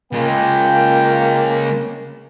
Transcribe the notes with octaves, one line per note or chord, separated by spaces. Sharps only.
C#3 G#3 A#3 F4 G5